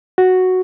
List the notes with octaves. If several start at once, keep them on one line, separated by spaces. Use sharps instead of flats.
F#4